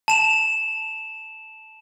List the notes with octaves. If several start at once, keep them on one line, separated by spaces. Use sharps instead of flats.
A5 E7 F7